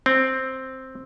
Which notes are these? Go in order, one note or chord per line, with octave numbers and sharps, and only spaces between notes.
C4